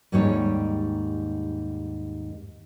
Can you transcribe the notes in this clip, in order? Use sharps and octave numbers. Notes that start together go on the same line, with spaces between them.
D#2 G#2 G3 C#4 D#4 C#5